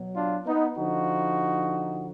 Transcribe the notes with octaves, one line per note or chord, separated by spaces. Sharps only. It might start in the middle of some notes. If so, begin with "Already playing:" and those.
Already playing: B2 F#3
D4 F4
B3 D#4
D3 F3 D#4 F#4